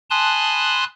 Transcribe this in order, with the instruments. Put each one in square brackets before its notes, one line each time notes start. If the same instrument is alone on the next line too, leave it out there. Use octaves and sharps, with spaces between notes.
[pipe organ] G#5 A5 B5 C6 D#6 F#6